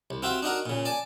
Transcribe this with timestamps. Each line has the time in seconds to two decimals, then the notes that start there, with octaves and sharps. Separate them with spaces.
0.10 C2
0.23 C4 F4 F#4 E5
0.43 D4 D#4 F#4 A#4
0.66 A#2 C#3
0.85 D5 G#5 A5